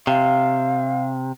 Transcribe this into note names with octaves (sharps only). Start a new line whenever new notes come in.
C3 F5